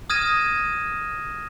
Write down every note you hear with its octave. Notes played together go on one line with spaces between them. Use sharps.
D#6 F6 G#6 A#6 D#7 E7